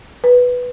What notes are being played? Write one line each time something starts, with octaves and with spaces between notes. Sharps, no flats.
B4